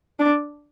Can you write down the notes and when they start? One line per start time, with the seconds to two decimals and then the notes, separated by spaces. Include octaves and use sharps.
0.19 D4